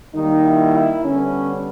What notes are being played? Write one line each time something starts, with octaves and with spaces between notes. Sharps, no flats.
D#3 G3 A#3 D#4
E4
E4
D3 G3 B3 C#4